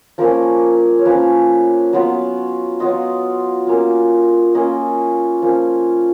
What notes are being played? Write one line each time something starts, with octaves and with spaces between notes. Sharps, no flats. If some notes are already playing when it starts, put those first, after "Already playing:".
F3 A#3 C#4 A#4
C#5
F3 A#3 C#4 B4
F#3 B3 F4
F#3 B3 F4 D#5
A#3 C#4 F4
A#3 C#4 F4 D#5
F3 A#3 C#4